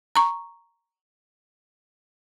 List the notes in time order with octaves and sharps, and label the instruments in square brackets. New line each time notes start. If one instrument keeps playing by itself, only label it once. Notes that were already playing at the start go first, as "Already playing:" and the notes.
[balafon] A#5 C#6